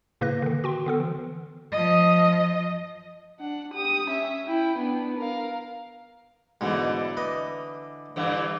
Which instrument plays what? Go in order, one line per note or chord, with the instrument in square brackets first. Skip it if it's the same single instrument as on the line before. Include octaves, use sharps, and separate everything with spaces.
[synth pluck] A2 C#3 A#3 B4 F#6 A#6
D3 D#3
F#4 G5 C6
D3 B3 A4
E3
[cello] F3 D#5
[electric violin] D4 F#5
G4 D#6
C#4 E5
E4 G5
B3 D4
A#4 F5
[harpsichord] G#2 B2 [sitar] D3 E3
[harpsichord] B4 D#5
[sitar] G2 D3 E3